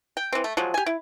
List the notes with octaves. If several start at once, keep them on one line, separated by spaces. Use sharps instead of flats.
G5
E3 C4
A3
F3 F#3 G#3
G4 G#5
E4